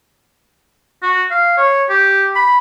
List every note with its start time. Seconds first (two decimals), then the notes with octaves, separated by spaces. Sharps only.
1.02 F#4
1.31 F5
1.57 C#5
1.89 G4
2.35 B5